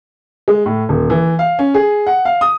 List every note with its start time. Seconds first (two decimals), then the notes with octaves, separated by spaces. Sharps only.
0.48 G#3
0.66 A2
0.89 D#1
1.10 E3
1.39 F5
1.59 C#4
1.74 G#4
2.07 F#5
2.25 F5
2.41 D#6